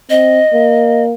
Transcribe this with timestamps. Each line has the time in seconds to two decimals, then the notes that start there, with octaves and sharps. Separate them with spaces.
0.10 C4 D#5
0.54 A#3